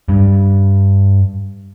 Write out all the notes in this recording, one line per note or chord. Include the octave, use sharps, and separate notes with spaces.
G2 G3